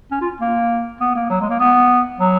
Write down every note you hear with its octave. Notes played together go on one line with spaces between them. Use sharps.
C#4
F4
A#3
B3
A#3
F#3
G#3
A#3
B3
F#3